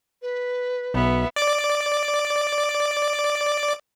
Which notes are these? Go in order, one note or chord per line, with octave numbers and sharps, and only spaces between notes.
B4
B1 B2 B3 E5
D5 D6